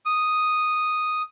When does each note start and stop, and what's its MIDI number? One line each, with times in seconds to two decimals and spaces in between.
0.06 1.22 87